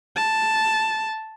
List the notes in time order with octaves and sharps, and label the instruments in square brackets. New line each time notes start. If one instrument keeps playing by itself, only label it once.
[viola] A5